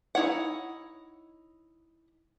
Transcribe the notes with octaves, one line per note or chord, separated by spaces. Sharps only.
D#4 E4 C#5 F#5